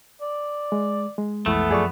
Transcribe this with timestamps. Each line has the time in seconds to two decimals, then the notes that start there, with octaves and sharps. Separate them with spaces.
0.21 D5
0.72 G#3
1.18 G#3
1.46 B1 F2 E3 A3 B3
1.71 F#2 F3 G#4 D5 C#6